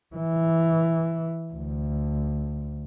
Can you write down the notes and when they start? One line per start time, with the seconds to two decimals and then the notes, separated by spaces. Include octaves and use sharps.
0.16 E3
1.54 D2